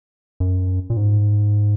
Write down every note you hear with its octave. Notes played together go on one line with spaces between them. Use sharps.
F#2
A#2
G#2